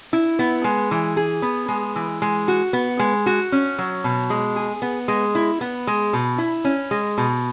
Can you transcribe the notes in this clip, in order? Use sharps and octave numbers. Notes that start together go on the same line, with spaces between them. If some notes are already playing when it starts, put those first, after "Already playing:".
E4
B3
G#3
E3
G#4
B3
G#3
E3
G#3
F#4
B3
G#3
F#4
C#4
F#3
B2
G#3
G#4
B3
G#3
E4
B3
G#3
B2
E4
C#4
G#3
B2